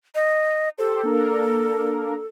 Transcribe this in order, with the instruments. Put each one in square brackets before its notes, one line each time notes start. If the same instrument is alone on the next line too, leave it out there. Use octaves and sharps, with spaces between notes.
[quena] D#5
[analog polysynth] G4 C5 [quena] A4
[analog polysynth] A#3 D4 A#4